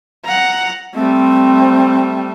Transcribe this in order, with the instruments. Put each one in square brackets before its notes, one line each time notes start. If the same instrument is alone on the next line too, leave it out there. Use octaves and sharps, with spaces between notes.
[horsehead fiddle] F#5 A#5
[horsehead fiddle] G3 A3 [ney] C4